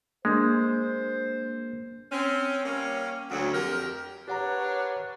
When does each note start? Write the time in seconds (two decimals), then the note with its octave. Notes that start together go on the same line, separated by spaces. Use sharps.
0.25 G#3 A#3 D4 A#4 C5
2.11 C4 C#4
2.66 G3 A#3 C#4
3.31 D2 F#3
3.53 F2 G4 A#4
4.28 D4 G4 A#4 B4 C#5 F#5 A#5